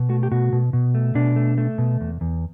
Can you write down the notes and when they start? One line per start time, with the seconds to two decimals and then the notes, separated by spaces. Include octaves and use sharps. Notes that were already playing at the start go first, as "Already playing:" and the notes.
Already playing: B2
0.09 A3 F#4
0.23 G4
0.31 B2 F#4
0.53 B2
0.73 B2
0.94 A3
1.15 B2 D4
1.36 A3
1.58 A3
1.78 B2
2.01 E2
2.21 E2